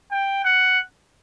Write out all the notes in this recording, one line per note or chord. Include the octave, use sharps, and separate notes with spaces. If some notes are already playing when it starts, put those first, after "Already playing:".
G5
F#5